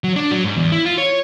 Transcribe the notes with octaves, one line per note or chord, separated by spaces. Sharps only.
F#3
D4
F#3
G#2
E2
E4
F4
C#5